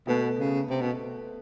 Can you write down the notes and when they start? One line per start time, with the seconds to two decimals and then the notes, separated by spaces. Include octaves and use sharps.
0.07 B2 A3 B3
0.39 C#3
0.70 C3
0.81 B2